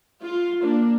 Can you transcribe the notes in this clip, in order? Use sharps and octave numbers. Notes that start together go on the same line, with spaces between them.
F4
A#3 D4